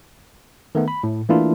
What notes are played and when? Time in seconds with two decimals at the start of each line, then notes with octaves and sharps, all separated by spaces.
0.75 D#3 A3 B3
0.88 B5
1.03 A2
1.29 E3 A3 A#3 D4 E4 F4